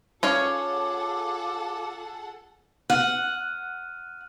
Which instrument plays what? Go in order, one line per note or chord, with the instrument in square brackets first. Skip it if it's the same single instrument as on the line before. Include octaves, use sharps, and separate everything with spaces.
[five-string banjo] C#4 C#5 F5 [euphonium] F4 [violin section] G#4 A4 F#5 [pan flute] D6
[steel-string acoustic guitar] F#5 [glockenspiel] F6 F#6 D#7